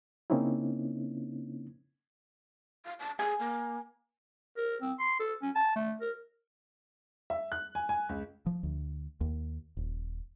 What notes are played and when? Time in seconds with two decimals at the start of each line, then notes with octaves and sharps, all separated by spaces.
0.30 C#3 A#3 C4 C#4 D#4 E4
2.85 F5
2.99 A5
3.19 G#4 G#5
3.40 A#3
4.57 A#4
4.82 C4
4.99 C6
5.20 A4
5.42 C#4
5.55 A5
5.76 A3
6.01 A#4
7.30 E5
7.52 F#6
7.75 G#5
7.89 G#5
8.09 C#2
8.46 F3
8.63 D2
9.21 D#2
9.77 D#1